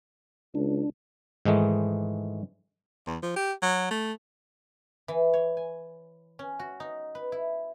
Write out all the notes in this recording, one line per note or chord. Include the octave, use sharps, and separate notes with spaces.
C#2 D4
G#2 D#3 E3 G#3 A3
E2
F3
G4
F#3
A3
E3
C#5
G#5
C#4
F#4
D#4
B4
E4